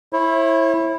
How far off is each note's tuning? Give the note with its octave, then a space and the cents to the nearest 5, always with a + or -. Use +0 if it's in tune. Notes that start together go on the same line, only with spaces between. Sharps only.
E4 +0 C#5 -45